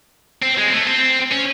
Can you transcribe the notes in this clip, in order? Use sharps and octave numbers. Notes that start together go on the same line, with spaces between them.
C4
G#3
C4
A3
C4
C#4